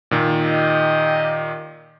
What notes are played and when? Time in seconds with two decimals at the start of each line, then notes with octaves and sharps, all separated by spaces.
0.11 A#2 D#3
0.41 G4 D#5